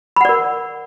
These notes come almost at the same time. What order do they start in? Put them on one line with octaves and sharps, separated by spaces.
B5 F#5 D5 A#4